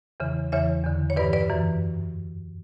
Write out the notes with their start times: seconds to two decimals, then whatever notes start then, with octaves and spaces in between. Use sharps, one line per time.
0.20 E2 C#3 E3
0.52 E2 C#3 E3 C#5 E5
0.84 E2 D3
1.10 C#5
1.17 G2 E3 B4 D5
1.33 B4 D5
1.50 F#2 E3